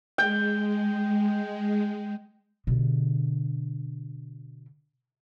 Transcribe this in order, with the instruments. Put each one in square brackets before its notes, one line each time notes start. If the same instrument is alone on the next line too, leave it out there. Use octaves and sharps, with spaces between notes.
[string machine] G#3 [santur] G5
[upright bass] B2 D3